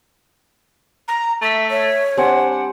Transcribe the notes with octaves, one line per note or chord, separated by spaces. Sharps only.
A#5
A3 E5
C#5 E5
G3 C4 D4 F#5 G#5